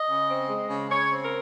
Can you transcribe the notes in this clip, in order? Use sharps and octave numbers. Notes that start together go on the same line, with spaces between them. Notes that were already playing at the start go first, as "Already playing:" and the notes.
Already playing: D#5
C#3
C4
G#3
C#3
C#3 C#5
C4
A#4